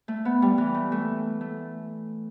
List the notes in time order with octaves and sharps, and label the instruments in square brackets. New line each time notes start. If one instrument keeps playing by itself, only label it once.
[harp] A3
B3
G3
E3
A3
A3
A3